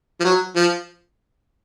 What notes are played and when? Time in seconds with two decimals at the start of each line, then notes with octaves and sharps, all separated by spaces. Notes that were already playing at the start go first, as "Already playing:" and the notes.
0.20 F3
0.24 F#3
0.56 F3